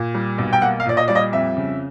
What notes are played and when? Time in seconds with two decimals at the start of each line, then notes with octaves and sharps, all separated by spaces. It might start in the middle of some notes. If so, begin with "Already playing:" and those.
Already playing: A#2
0.15 G3
0.38 B1
0.53 G5
0.62 A#3 F#5
0.80 F5
0.86 A#2 D5
0.97 D#5
1.08 G3 D5
1.15 D#5
1.32 F2 E5
1.57 C#3